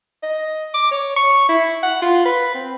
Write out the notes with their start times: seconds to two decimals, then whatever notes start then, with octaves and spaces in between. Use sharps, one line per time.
0.23 D#5
0.74 D6
0.91 C#5
1.16 C#6
1.49 E4
1.83 F#5
2.02 F4
2.25 B4
2.55 C4